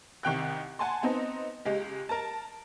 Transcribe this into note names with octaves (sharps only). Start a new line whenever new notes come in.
C2 D#3 G5 F#6
F#5 G#5 A5 C6
B3 C4 D#4
C#2 G#3 G4
A#4 A5